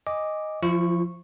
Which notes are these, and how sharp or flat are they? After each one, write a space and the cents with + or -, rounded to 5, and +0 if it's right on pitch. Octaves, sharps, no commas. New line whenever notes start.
D#5 +0 G#5 -25 D6 +0
F3 +0 E4 +45 C#6 -10